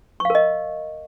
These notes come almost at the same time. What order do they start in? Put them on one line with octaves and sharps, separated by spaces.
C#6 F5 A#4 D#5